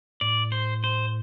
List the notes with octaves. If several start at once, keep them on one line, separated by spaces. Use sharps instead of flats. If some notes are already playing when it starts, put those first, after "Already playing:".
A2 D5
C5
C5